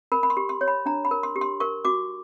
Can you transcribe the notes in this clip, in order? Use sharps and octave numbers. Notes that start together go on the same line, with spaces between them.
A#4 B5
B5
C6
G4
C6
C#5
B5
D4 A#5
B5
A#4
C6
G4
C6
A#4 C#6
F#4 D6